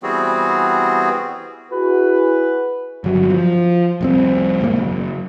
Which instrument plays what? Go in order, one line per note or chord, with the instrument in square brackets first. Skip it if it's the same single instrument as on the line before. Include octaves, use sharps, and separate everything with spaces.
[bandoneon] E3 G3 B3 C4 F#4 G#4
[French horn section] E4 F#4 G#4 [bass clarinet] B4
[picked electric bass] G1 F#3
F3
F1 C2 C4
E1 G#2 G#3 A#3
F#1